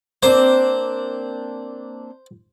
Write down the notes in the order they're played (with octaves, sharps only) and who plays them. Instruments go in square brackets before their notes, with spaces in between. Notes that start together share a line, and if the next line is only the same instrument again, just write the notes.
[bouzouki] A#3 C4 D4 [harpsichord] C5